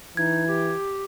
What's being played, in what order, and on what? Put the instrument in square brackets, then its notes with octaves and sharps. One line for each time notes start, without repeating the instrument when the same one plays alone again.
[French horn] E3 [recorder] D#4 [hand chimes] G#6
[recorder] G4